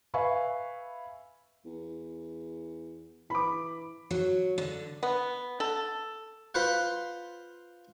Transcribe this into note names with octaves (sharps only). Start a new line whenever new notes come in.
B4 E5 F5 G#5 B5 C#6
E2
E3 B5 D6
F#3
D3
B3
A4
F4 B4 C5 F#5